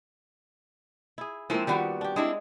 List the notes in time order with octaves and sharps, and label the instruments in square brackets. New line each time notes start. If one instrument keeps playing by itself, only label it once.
[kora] E4 G#4
[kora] F3 A#3 C4 [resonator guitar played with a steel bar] G#3 E4 C5
[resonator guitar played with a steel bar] D#3 B3 F#4 [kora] G3 G4
[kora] D4 G4
[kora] G#3 G#4 [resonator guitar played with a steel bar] C4 D4 E4